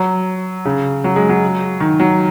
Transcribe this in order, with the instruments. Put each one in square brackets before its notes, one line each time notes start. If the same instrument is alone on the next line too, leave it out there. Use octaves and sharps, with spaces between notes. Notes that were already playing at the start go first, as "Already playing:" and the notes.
Already playing: [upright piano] F#3
C#3
F#3
G#3
F#3
D#3
F#3